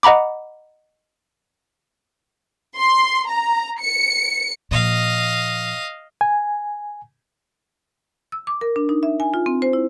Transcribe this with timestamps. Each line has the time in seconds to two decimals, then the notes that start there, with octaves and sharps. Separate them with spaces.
0.03 D#5 F#5 A#5 B5 D6
2.75 C6
3.28 A#5
3.80 C#7
4.71 A#2 F3 D#5 F5
6.21 G#5
8.32 E6
8.47 D6
8.61 A#4
8.76 D4
8.89 D#4
9.03 E5
9.20 G#5
9.34 F4
9.46 C4
9.62 C5
9.73 E4